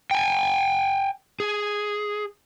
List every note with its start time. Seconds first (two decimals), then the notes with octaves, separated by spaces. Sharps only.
0.11 G5 G#5
1.40 G#4